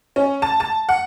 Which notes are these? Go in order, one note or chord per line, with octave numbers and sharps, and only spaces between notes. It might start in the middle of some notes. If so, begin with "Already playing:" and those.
C#4
A5
A5
F#5